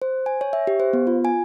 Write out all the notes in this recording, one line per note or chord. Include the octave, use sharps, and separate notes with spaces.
C5
G#5
C#5
E5
G4
C5
B3
F4
G#5